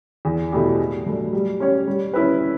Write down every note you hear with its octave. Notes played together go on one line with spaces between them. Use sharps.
E2
B2 A3 E4 G4
A2
F#3 A3 D4
G3
C#4 G4 C#5
G3
C#4 E4 B4